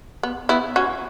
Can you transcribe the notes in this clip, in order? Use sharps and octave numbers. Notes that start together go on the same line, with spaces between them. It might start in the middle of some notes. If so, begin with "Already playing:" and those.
B3
B3 E4
C#4 F#4